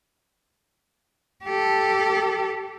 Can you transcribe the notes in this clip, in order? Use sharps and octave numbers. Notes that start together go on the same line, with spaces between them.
G4 A4